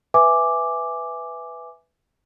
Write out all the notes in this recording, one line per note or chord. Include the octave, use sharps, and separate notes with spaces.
B4 E5 G#5 D6